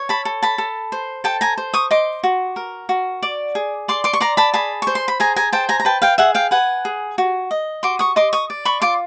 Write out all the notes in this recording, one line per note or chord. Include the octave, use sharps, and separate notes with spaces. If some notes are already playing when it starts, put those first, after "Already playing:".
Already playing: C#5
A5 B5
A4
A5 B5
A4
C5
A4 G5 A5
G#5 A#5
C5
C#6 D#6
D#5 C6 D6
F#4
A#4
F#4
D5
G#4
D5 C6 D6
C6 D6
C#6
D5 A#5 C6
A5 B5
G#4 A5 B5
C5 C#6
C6
B5
G#4 G#5 A#5
G#5 A#5
C5 G5 A5
G#5 A#5
A#5
B4 G5 A5
F5 G5
G#4 E5 F#5
F5 G5
B4 F#5 G#5
G#4
F#4
D#5
F#4 C6 D6
C#6 D#6
D#5 C6 D6
C#6 D#6
D5
B5 C#6
F4 C6 D6